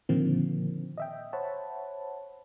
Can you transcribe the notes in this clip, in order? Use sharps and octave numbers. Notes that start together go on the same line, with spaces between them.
A#2 D3 D#3 F3 A#3 C4
D#5 E5 G5
C5 C#5 E5 F#5 A5 B5